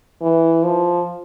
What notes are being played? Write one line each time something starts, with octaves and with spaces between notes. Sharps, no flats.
E3
F3